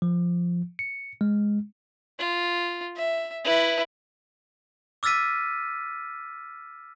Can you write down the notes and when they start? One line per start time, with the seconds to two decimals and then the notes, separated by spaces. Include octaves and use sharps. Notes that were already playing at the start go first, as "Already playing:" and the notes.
0.02 F3
0.79 C#7
1.21 G#3
2.19 F4
2.96 E5
3.45 E4 B4
5.03 D6 E6 F6 A6 B6 D#7